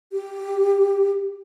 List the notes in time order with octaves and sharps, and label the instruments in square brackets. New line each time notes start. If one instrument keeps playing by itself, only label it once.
[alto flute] G4